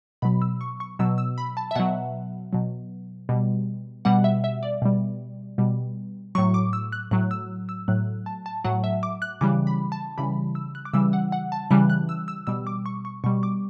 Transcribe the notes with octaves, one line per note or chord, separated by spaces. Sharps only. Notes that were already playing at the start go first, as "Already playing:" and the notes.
B2 F#3 B5
E6
C#6
C#6
B2 F#3 E6
E6
B5
A5
E5
B2 F#3 F#5
B2 F#3
B2 G3
B2 G3 F#5
E5
E5
D5
B2 G3
B2 G3
A2 F#3 C#6
D6
E6
F#6
A2 F#3 F#6
E6
E6
A2 F#3 F#6
A5
A5
A2 F#3 F#5
E5
D6
F#6
C#3 E3 G3 D6
B5
A5
C#3 E3 G3 B5
E6
F#6
D6
C#3 E3 G3 E6
F#5
F#5
A5
C#3 E3 G3 F#6
F#6
E6
E6
B2 G3 E6
D6
C#6
C#6
B2 G3 C#6
D6